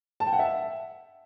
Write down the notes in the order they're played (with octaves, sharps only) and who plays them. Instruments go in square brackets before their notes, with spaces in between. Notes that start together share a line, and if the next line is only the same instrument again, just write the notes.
[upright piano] A5
G5
F#5
E5